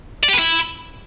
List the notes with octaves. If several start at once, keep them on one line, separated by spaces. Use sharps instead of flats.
D5
G4
B4
E4